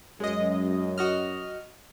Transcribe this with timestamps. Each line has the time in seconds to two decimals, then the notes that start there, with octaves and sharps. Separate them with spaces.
0.20 F#2 G#3 D#5
0.98 F#4 D#5 F6